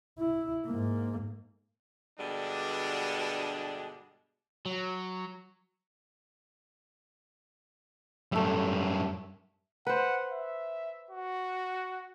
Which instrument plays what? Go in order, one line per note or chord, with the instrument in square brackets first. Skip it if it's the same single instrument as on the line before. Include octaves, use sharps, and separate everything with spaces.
[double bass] E4
G#2 A#3
[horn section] G2 B2 D3 G#3 D4
[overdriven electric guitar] F#3
[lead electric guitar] F#2 G3 [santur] A3 E5
[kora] B4 C5 [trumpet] F#5
[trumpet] E5
F#4